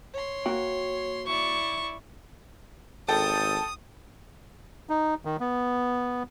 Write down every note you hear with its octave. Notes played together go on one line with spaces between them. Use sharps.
C#5 C6
A#3 F#4 G5
E4 D5 C#6
G#1 A4 G5 D#6
D#4
D#3
B3